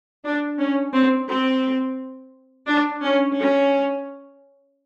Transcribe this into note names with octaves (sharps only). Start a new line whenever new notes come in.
D4
C#4
C4
C4
D4
C#4
C#4